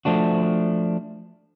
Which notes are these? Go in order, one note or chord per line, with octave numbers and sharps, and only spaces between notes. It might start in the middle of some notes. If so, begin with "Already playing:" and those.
F3 A3 D4 F#4